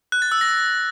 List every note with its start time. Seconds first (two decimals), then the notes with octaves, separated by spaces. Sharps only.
0.12 F#6
0.22 A6
0.32 E6
0.41 A#6